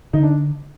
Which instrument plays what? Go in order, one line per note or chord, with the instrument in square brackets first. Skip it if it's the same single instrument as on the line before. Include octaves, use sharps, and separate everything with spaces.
[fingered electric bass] D3 [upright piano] D#4
[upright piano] D4